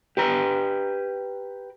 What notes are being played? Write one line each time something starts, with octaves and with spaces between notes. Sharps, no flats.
G4 B4 A#5